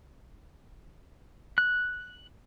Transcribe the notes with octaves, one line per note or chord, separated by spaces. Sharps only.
F#6